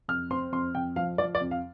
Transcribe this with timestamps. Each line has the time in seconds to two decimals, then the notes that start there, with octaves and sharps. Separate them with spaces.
0.08 F2 F6
0.31 C4 C6
0.52 F2 C6
0.75 F2 G5
0.96 F3 F5
1.18 F3 D5
1.35 D5
1.41 F2
1.51 F5